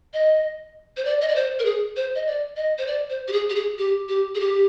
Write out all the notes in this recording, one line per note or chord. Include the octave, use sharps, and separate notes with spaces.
D#5
C5
D5
D#5
D5
C5
A#4
G#4
C5
D#5
D5
D#5
C5
D5
C5
G4
G#4
G4
G#4
G4
G4
G#4
G4